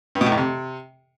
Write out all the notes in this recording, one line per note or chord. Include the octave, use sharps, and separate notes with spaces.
G2
B2
A2
F2
C3